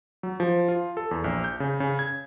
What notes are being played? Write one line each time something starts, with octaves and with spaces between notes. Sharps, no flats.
F#3
F3
F4
A4
E2
A#1
G6
C#3
C#3
G#6